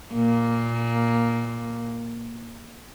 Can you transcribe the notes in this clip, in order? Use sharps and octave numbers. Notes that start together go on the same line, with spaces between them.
A#2 A#3